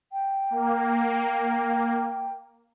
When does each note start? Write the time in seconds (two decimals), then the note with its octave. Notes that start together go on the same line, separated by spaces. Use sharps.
0.13 G5
0.50 A#3